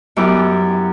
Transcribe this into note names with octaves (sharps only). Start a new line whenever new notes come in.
F#2 B3 E4 G4 D6